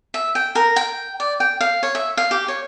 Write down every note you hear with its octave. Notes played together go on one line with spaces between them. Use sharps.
E5
G5
A#4
G5
D5
G5
F5
C#5
E5
F5
G4
C#5